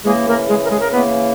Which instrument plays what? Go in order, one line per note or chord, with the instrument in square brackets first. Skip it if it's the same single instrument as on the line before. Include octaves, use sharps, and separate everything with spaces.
[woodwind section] C#3 E3 G#3 A#3 G#4
A#3 A#4
G#3 G#4
A#4
G#3 G#4
A#4
C#3 E3 A#3 B3 B4